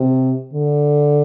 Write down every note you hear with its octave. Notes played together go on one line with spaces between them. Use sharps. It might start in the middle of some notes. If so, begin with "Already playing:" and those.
Already playing: C3
D3